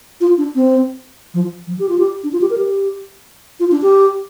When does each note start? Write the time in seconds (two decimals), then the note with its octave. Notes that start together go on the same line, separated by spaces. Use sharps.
0.21 F4
0.38 D4
0.55 C4
1.34 F3
1.67 F3
1.79 G4
1.89 F4
1.99 G4
2.24 D4
2.33 F4
2.41 G4
2.50 A#4
2.58 G4
3.60 F4
3.71 D4
3.82 G4